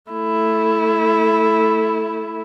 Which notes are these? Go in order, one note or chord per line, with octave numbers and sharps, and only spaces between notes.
A3 E4